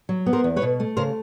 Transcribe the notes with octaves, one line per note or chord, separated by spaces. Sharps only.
F#3
B3
A#4 C5
E2
B4 C#5
B2
A3
C#3 A#4 C5